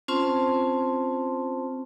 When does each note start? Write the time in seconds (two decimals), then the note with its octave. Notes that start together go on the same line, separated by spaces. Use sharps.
0.08 C4 C#4 F4 C5 A5 C6